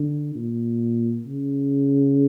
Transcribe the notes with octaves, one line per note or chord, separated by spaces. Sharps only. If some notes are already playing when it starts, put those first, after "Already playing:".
Already playing: D3
A#2
C#3